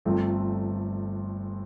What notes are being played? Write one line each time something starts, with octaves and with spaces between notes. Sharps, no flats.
G1 G2 F3 A3 C4